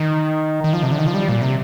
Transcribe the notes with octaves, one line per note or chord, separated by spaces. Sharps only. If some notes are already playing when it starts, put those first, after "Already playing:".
Already playing: D#3
D#3
F3
C3
D3
D#3
F3
G3
A#2
C3